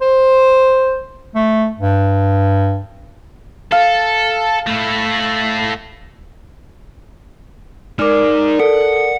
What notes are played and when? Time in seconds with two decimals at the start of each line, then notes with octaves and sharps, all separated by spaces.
0.02 C5
1.35 A3
1.79 G2
3.72 A4 F5
4.67 A3 E4
7.99 D#4 A#4 D5 G#5 D6 F6
8.60 A4 F#5